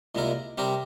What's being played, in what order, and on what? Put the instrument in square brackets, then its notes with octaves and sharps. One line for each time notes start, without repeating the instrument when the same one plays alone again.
[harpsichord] C2 A#2 G#3 E4 A#4
C3 G3 C4 G4 A#4